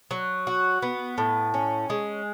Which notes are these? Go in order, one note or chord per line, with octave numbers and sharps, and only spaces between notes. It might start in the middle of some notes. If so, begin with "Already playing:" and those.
F#3
F#4
B3
A2
C#4
G#3